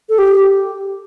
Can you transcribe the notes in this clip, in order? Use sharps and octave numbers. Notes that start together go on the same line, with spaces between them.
A4
G4